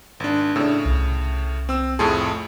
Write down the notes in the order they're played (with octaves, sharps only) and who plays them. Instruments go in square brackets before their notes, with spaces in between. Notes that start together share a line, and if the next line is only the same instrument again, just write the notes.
[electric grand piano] G#1 D4
[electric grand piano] A2 C#3 [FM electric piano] D4 E6
[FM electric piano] C2
[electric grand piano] C4 E6
[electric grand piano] F2 A2 G#4 [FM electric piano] A5 C6 C#6